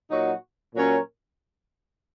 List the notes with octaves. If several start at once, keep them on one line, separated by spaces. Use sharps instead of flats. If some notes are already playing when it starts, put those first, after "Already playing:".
A#2 F#3 D#4 F#4
A#2 F#3 C#4 A#4 C#5